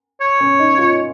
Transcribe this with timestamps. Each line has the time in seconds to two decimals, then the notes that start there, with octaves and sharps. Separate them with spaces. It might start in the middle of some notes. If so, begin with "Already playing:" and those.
0.21 C#5
0.40 C#4
0.59 D#4
0.78 F4